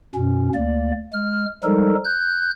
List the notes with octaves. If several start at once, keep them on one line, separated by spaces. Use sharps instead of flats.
F#2 B2 C#4
D2 A#3 D5
G#3 F6
F3 G3 G#3 D#4 A4 A#4
F#6 G6